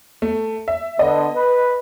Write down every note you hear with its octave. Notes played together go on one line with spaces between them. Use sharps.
A3
E5
D3 B3 D#5
B4